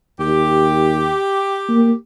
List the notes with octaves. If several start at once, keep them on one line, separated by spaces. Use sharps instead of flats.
D#2 G4
A#3